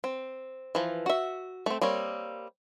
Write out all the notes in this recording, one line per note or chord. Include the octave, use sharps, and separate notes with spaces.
C4
E3 F3
F#4 E5
A3 C4
G3 A#3 C4 C#5